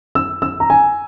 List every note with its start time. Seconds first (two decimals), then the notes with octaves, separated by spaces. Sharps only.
0.15 E6
0.42 E6
0.60 A#5
0.70 G#5